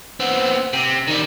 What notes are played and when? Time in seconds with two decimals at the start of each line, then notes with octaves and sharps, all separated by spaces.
0.20 B3 C4
0.73 C3
1.08 D#3 G3